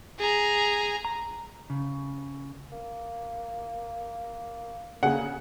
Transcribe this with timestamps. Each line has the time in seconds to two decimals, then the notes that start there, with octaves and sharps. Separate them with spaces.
0.19 G#4 A#5
1.05 A#5
1.70 C#3
2.72 A#3
5.03 C#3 A#3 G#4 F#5